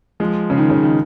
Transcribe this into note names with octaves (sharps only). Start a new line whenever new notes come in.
F3 G#3
C#3
D#3
C#3
D#3